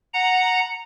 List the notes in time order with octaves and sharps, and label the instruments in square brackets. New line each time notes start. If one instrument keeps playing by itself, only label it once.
[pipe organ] F#5 A#5